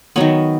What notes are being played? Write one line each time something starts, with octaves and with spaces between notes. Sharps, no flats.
D#3 F#3 B3 C#5